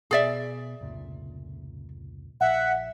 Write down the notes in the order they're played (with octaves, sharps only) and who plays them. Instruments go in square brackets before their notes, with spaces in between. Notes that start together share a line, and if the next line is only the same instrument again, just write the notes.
[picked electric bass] B2 [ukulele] G#4 D5 E5
[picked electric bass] F1 C#2 A#2
[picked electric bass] A#1 [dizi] E5 [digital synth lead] F#5